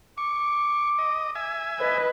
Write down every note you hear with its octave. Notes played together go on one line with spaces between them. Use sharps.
C#6 D6
D#5
E5 G#5
B4 D#5